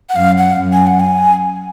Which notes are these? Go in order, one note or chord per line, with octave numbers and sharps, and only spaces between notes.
F#5
F#2 F5
F#5
F#2
G#5
F#5
G#5